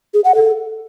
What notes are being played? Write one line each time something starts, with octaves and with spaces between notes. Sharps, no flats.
G#4
F#5
A4